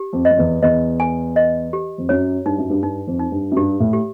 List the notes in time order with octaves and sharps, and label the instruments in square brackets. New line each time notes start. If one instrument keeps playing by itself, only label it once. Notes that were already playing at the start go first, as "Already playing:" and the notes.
Already playing: [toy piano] G4
[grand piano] F2
[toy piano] D#5
[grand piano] F2
E2
[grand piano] E2 [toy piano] D#5
[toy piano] G#5
D#5
G4
[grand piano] F2
[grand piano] F#2 [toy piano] C#5
[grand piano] G2 [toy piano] D#4
[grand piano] F#2
G2
[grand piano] G2 [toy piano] D#4
[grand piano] F2
[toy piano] D#4
[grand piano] G2
F#2
[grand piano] G2 [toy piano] G4
[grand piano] A2
[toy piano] G4